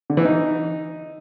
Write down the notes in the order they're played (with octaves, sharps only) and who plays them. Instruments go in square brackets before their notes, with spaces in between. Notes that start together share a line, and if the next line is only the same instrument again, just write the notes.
[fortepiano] D3
E3
D#4